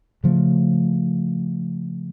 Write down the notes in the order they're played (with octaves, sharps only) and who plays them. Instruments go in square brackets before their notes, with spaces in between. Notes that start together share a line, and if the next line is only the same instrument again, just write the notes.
[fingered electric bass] C#3 F3 A3